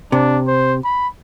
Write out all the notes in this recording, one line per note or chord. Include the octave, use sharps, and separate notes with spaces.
C3 D4
C5
B5